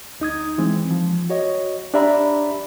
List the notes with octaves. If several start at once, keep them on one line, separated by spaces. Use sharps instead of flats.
D2 D#4 D#6 G#6
E3 G#3 C4
F3
F#4 C#5 D#5
D4 G4 D5 E5 A#5 B5